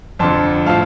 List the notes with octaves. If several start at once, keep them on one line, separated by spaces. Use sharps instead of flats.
F2 D3 F3 A5 C6
A2 F3 F5 A5